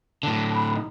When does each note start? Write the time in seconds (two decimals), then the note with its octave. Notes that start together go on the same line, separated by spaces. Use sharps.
0.23 A2 D3 A5
0.55 B5
0.74 D#4